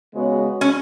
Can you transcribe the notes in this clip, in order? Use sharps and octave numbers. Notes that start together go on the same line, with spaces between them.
C#3 G#3 B3 F#4 C#5
C#4